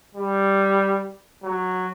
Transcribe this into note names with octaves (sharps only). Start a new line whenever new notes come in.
G3
F#3